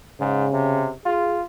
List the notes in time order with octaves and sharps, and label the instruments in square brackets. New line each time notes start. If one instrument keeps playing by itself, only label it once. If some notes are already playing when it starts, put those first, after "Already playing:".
[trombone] G#2 [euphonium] C#3
[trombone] C3
[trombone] F4 [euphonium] G#4